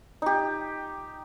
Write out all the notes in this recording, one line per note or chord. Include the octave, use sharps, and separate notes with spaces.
D#4 G4